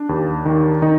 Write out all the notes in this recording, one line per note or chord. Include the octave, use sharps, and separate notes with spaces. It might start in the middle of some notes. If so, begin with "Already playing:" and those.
Already playing: D4
D#2
D#3
D#3 D#4